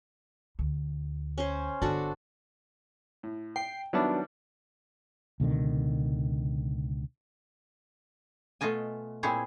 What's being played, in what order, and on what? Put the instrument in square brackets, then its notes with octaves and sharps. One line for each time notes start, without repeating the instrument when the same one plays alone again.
[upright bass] D2
[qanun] C#4 C5
[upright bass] G1 [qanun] D4 F#4 A4
[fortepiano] A2
[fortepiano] G5 [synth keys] C7
[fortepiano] D#3 G3 E4 [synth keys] F#3 B3 D4
[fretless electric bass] C#2 B2 D3 D#3
[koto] B2 A3 F4 D#5 G#5
A#2 C4 E4 G#4 C#5